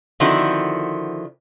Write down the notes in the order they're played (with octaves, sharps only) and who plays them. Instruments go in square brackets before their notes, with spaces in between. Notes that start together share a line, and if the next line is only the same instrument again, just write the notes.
[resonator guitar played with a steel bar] D3 D#3 F3 C4 E4 F#4